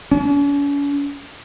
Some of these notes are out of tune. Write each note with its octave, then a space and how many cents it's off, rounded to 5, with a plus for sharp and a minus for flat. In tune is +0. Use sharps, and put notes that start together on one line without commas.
C#4 +45